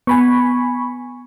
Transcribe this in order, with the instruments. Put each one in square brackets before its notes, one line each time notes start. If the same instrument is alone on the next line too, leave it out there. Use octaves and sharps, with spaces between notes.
[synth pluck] B3 [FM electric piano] G#5 B5 C#6